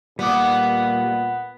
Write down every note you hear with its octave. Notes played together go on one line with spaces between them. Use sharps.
A#2 G3 B3 D6